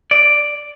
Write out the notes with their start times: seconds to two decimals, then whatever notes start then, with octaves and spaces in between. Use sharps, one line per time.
0.11 D5